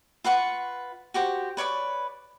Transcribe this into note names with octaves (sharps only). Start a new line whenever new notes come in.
F4 B4 F#5 C#6
F#4 G4 C5
B4 C#5 D5 B5